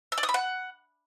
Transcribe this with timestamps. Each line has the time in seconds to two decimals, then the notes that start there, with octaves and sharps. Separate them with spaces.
0.12 E6
0.18 D5
0.23 D#6
0.29 B5
0.34 F#5